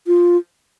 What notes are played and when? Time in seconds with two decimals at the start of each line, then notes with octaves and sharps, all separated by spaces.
0.07 F4